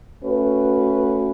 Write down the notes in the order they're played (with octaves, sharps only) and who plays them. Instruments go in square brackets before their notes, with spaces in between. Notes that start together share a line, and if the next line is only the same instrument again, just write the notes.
[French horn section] A3 C#4 F#4 B4